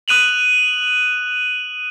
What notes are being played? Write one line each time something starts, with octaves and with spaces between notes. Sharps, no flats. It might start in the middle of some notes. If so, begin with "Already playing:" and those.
D#6 F#6 D#7 F7 F#7